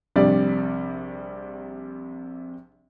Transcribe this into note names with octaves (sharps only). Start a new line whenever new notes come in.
A#1 C3 G3 D5